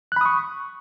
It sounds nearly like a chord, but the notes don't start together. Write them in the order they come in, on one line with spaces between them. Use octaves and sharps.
F#6 B5 D#6 C#6